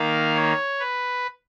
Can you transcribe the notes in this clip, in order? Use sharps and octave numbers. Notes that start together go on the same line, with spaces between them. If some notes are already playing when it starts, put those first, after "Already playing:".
Already playing: D#3 A#3 F5
C#5
B4